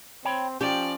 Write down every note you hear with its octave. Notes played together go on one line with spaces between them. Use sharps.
C4 C#5 G5 B5
F3 C#4 G4 D5 F6